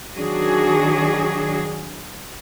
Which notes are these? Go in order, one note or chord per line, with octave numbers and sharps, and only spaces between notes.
D#3 F#3 D4 F#4 G#4